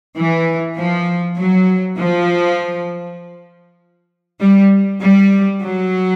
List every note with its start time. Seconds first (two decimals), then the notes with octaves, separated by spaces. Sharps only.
0.16 E3
0.77 F3
1.37 F#3
1.97 F3
4.41 G3
5.01 G3
5.61 F#3